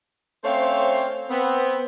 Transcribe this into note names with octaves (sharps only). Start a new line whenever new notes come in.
A3 C4 C#4 C5 C#5 F5
B3 C4